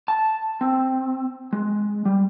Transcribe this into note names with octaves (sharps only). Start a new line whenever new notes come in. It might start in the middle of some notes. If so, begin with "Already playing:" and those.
A5
C4
G#3
G3